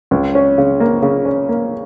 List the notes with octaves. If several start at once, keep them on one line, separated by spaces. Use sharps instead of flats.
C#2
C#4
C#3
A#3
C#3
C#4
A#3